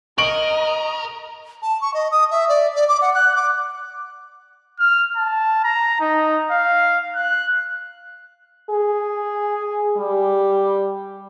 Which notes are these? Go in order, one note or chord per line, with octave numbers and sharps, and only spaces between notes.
A#4 D#5 C#6 D7 F#7
A5
C#6
D#5
D#6
E5
D5
D5
D6
F#5
F#6
D6
F6
A5
A#5
D#4
F5
F#6
G#4
G3